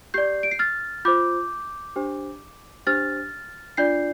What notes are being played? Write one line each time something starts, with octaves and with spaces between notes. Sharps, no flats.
G4 D5 G6 C7
D7
C7
F6 A6
F4 C5 D6 G6
D4 G4 C5
D4 G4 C5 F6 A6
D4 F4 D5 G6 C7